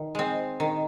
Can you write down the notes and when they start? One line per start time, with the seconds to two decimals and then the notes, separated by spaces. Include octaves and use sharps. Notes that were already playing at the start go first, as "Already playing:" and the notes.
Already playing: D#3
0.15 G#3 C4
0.60 D#3